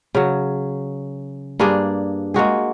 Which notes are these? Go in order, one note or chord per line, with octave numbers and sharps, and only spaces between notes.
C#3 F#3
G2 A#3 D4 G#4
G#3 A#3 F#4 G#4